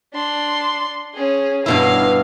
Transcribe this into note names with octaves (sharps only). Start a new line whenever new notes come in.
D4 C6
C#4 G#4
G2 B2 E4 F5